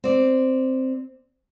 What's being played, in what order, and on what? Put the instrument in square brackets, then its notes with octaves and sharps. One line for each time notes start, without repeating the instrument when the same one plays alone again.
[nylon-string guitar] C4 D5